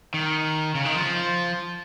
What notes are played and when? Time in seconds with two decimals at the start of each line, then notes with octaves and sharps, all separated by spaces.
0.14 D#3
0.75 C#3
0.85 D#3
0.94 F3